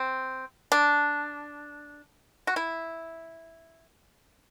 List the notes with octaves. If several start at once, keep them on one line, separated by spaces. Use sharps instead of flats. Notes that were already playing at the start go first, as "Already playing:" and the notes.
Already playing: C4
D4
F#4
E4